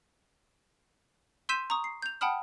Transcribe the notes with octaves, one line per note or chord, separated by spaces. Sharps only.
C6 E6 G6 B6 D#7 E7
A#5 C#6 D#6
C7
G6 F7
F#5 G5 A5 B5 D#6 F6